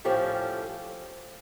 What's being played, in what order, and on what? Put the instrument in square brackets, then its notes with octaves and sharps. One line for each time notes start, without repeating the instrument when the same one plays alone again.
[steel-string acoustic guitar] A2 F3 A3 C#4 G4